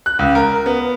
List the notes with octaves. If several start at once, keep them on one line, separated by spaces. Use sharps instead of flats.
F#6
C#2
A#4
B3